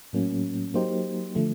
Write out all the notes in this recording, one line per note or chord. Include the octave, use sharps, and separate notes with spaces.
A2 F#3 A#3 C#4
F#3 A#3 D#4 G4 C5
D3 F3 A3